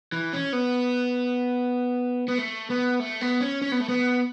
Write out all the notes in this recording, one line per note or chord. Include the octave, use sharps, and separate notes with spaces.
E3
C#4
B3
B3
A3
B3
A3
B3
C#4
C#4
B3
A3
B3